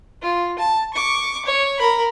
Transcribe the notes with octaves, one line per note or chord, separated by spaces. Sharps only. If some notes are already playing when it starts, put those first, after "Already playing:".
F4
A5
C#6 D6
C#5
A#4 B5